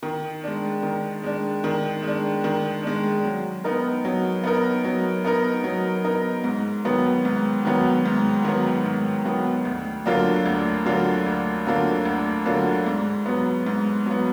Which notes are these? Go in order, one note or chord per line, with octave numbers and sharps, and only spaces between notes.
D#3
G#3 D4
D#3
G#3 D4
D#3
G#3 D4
D#3
G#3 D4
F#3
B3 D#4 A#4
F#3
B3 D#4 A#4
F#3
B3 D#4 A#4
F#3
B3 D#4 A#4
G#2
D#3 F#3 B3
G#2
D#3 F#3 B3
G#2
D#3 F#3 B3
G#2
D#3 F#3 B3
D2
D3 F#3 A#3 F4
D2
D3 F#3 A#3 F4
D2
D3 F#3 A#3 F4
D2
D3 F#3 A#3 F4
G#2
F#3 B3
G#2
F#3 B3